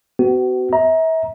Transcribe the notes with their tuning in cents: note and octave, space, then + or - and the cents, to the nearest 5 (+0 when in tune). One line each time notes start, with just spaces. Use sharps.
B3 +45 F#4 +30
E5 -35 A#5 +15